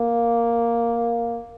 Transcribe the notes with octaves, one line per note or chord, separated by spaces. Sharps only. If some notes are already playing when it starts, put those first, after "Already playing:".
Already playing: A#3